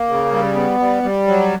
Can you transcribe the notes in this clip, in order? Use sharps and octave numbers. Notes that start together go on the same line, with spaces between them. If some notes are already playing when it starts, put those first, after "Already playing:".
Already playing: A#3
C#3
G3
B3
G3
G3
F#3